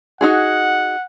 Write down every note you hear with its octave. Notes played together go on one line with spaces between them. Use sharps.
D#4 F#4 G#4 F#5